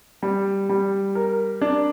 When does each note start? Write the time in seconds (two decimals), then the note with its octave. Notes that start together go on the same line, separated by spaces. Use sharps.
0.23 G3
0.69 G3
1.15 A#4
1.61 D4